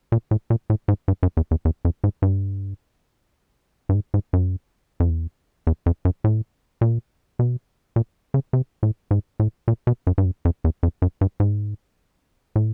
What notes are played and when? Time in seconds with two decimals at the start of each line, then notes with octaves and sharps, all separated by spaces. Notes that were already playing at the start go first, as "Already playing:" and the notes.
0.12 A#2
0.31 A2
0.50 A#2
0.70 A2
0.88 G#2
1.08 G2
1.23 F#2
1.37 E2
1.51 E2
1.65 E2
1.85 F2
2.04 G#2
2.22 G2
3.89 G2
3.95 G#2
4.14 G#2
4.33 F#2
5.00 F2
5.10 E2
5.67 E2
5.86 F2
6.05 F#2
6.24 A2
6.81 A#2
7.39 B2
7.96 A#2
8.34 C#3
8.53 C3
8.83 A2
9.11 G#2
9.40 A2
9.68 A#2
9.87 B2
10.07 F#2
10.18 G2
10.25 F#2
10.45 F2
10.64 E2
10.83 F2
11.02 F#2
11.21 G2
11.40 G#2
12.56 A2